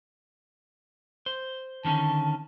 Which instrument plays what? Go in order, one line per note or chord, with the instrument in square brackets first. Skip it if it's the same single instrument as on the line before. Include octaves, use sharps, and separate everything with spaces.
[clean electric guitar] C5
[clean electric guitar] D3 D#3 C#4 [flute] A5